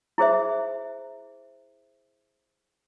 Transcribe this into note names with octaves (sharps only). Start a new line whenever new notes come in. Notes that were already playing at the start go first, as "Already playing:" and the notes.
E4 G#4 C5 E5